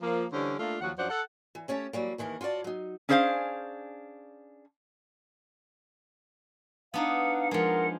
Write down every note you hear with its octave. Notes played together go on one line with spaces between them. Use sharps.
F3 A#3
D3 E3 G3 C#4 C5 C#5
A3 A#3 D4 F4
D#2 F3 F#3 F#4 F#5
F#2 F3 F#3 D4 C5 F#5
A4 F#5
E3
A3 C#4 G4 C#5 A5
E3 F#3 G3 A#3
D#2 D#3 E3 A#4
F4 F#4 A4 D5 A5
F#3 D#4
C#4 D4 G#4 C5 D#5 F5
B3 D4 D#4 F5 F#5
F3 G#3 A#4 F#5 C6